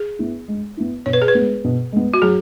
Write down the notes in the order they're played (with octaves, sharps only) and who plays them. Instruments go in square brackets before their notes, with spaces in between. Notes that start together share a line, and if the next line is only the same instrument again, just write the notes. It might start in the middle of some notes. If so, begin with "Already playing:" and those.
Already playing: [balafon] G#4
[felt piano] B3 E4
G#3
B3 E4
[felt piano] B2 [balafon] C#5
[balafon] B4
G#4
B4
[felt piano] G#3 B3
B2
G#3 B3
[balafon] F#4
[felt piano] F#3 [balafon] G#4